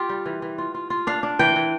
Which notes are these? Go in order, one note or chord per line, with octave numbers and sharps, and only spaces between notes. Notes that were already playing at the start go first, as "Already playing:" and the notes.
Already playing: F4 G4
G3
E3
E3
F4
F4
F4
D4 F5
D4
E3 G5
E3